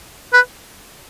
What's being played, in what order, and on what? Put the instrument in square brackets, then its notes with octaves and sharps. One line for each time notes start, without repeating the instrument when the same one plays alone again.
[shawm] B4